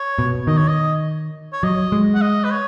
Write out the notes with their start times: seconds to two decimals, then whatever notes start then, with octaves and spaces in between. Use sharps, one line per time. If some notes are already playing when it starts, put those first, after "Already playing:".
Already playing: C#5
0.19 B2
0.47 D#3 D#5
0.57 C#5
0.68 D#5
1.53 C#5
1.63 F#3 D#5
1.92 G#3
2.15 F#5
2.22 D#5
2.44 B4
2.51 C#5